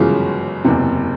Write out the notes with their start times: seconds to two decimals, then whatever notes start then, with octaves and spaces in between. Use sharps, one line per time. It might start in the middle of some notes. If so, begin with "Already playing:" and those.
Already playing: G1 F#2 C#3 E3 G#3 F4
0.64 F#1 E2 C3